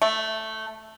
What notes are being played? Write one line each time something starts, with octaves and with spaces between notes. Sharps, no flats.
A3